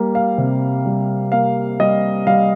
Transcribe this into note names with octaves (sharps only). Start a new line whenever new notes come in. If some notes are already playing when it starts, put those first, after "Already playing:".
Already playing: G3 A#3
F5
C3
G3
A#3 F5
G3 D#5
G3 F5